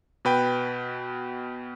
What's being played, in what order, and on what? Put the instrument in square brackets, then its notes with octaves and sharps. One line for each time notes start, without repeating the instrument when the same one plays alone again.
[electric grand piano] B2 B4 G5